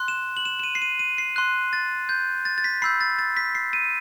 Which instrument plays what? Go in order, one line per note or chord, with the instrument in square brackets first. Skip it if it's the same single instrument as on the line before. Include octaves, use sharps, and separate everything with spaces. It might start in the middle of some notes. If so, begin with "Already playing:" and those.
Already playing: [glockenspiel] C6 F#6
E7
F#7
E7
E7
D#7
C7
D#7
D#7
C7
C6 F#6
A6
G6
A6
A6
B6
B5 E6 G6 C7
A6
A6
B6
C7
D#7